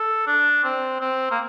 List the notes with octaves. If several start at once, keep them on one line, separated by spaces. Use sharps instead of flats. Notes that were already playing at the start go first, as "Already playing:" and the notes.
Already playing: A4
D4
C4
C4
A#3